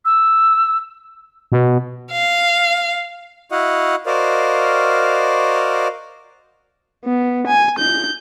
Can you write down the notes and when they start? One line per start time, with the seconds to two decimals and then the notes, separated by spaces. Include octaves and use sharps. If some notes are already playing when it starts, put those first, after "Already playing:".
0.05 E6
1.52 B2
2.12 F5
3.52 E4 F#4 D#5 F5 F#5
4.06 F#4 A#4 C5 D5 D#5 F5
7.04 B3
7.47 G#5
7.79 G6